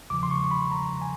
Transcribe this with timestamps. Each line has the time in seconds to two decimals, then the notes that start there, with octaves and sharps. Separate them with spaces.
0.10 E2 C#3 F3 D6
0.23 C6
0.31 C#6
0.51 B5
0.71 A#5
1.01 G#5